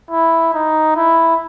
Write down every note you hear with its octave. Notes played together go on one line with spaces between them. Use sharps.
E4
D#4
E4